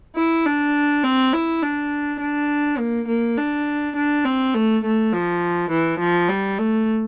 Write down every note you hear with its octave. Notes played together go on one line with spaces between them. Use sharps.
E4
D4
C4
E4
D4
D4
A#3
A#3
D4
D4
C4
A3
A3
F3
E3
F3
G3
A3